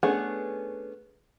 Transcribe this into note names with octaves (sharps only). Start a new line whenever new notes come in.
A3 B3 C#4 D4 G#4